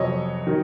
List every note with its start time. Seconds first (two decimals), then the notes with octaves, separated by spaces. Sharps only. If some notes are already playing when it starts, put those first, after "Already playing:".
Already playing: F2 C3 F#3 C#5 D#5
0.47 D#3 F#3